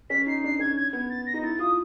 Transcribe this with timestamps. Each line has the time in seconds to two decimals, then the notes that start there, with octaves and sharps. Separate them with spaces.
0.10 C#4 B6
0.27 D#4 C7
0.44 D4 C7
0.59 C#4 G#6
0.76 G#6
0.93 B3 G#6
1.09 A6
1.26 A#6
1.34 D#4
1.43 E4 A6
1.59 F4 D#6